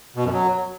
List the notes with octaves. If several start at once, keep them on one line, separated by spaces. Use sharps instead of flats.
B2
F#2
F#3